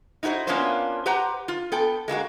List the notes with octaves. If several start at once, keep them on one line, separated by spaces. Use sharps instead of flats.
D#4 E4 F#4 B4 C5
A#3 B3 C#4 D4 F4 C5
G4 B4 C5 F#5 A#5
F4
B3 A4 G5
G#3 A#3 E4 F#4